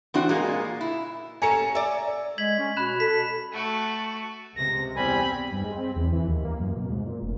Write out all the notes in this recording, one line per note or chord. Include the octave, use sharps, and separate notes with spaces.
E3 C4 D4 F#4
A#2 G#3 A#3
E4
C#4 A4 G#5 A#5 C#7
D5 E5
G#3 G#6 B6 F#7
C#4
B2 B5 F#6 E7
A4 B6
A3 F#4
C#2 C3 A#6
E2 G3 C4 G#5 B5
G2
G#3
C4
E2
E3
D#2
A#3
F#2
B2
G#2
A#2
F1